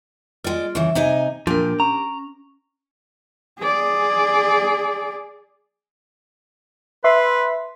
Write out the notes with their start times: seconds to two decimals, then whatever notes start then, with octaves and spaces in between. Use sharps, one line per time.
0.44 G#3 F4 D5
0.75 C#3 E3 E5
0.95 C3 D#4 G#5
1.47 A#2 F3 D4 G4 A#4
1.80 C#4 A#5
3.59 G#4 D5
7.04 B4 E5 C6